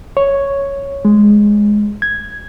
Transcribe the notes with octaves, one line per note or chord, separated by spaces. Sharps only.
C#5
G#3
G#6